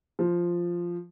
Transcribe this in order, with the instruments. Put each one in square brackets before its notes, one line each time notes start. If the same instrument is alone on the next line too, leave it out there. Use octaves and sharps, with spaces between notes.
[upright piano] F3